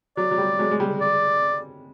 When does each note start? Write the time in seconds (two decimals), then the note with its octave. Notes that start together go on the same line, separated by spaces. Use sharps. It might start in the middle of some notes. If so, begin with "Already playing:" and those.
0.17 F#3 D5
0.31 F#3
0.38 G3
0.59 F#3 G#3
0.71 G#3
0.80 G3
1.01 D5